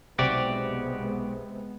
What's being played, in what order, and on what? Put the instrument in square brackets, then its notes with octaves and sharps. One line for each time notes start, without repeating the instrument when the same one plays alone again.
[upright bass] B1 [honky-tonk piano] C3 [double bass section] G#3 B3 [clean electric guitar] F#4 G4 D5